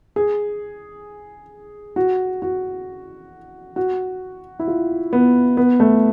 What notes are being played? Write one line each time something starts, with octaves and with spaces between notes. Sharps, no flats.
G#4
F#4
F#4
F#4
E4
F4
B3
B3
A3